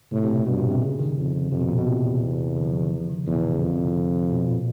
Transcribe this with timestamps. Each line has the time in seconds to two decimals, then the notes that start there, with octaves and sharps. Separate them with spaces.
0.12 A2 C3
0.24 C3
0.29 B2
0.46 G2 B2
0.58 A#2
0.70 C3
0.82 C#3
0.99 D#3
1.17 F2
1.51 F2 C3
1.60 B2
1.69 A#2
1.78 B2
1.87 E2 C3
2.04 C3
2.56 D3
2.65 F3
2.74 E3
2.82 D#3
2.91 C#3
3.00 F3
3.09 D#3
3.18 C#3
3.27 E2 B2
3.35 A#2
3.44 B2
3.53 C#3
3.61 F2 D3
3.78 C3
4.32 B2
4.49 A#2